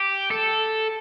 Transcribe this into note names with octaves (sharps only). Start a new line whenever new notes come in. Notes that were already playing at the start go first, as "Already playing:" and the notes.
Already playing: G4
A4